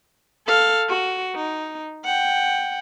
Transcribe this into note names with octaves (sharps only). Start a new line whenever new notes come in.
A4 F5
F#4
D#4
F#5 G5